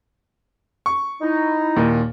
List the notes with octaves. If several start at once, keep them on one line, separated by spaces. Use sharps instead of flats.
C#6
D#4 E4
D#2 A#2